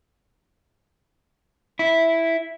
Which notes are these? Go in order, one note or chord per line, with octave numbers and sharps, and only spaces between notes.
E4